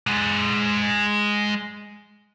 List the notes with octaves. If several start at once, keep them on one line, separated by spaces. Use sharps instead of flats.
G#3 F#5